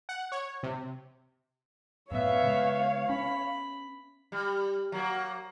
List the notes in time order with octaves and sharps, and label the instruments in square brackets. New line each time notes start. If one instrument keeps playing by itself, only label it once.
[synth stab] F#5
C#5
C3
[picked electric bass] F#2 A2 [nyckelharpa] B3 E5 [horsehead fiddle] C#5 F5
[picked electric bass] C#3 G#3
[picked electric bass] C#4 [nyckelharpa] B5
[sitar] G3
F#3 A#3